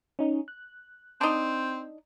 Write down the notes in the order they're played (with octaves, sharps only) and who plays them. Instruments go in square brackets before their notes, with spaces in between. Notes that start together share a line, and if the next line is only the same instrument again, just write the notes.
[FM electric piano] C#4 D#4
F#6
[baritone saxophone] C4 [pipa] D4 D#4